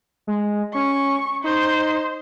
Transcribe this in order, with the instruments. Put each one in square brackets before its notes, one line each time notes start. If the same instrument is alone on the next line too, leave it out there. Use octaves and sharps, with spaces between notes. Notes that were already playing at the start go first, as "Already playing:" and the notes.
[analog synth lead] G#3
[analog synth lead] C#4 [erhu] C#6
[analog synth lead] D#4 [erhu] C5